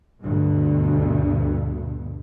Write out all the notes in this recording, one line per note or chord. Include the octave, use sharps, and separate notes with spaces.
D2 G2 B2